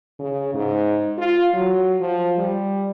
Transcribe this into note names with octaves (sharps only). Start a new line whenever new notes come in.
C#3
G#2
F4
F#3
F3
G3